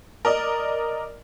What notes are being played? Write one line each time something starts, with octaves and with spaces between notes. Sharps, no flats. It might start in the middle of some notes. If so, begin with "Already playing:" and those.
A#4 D5 D#5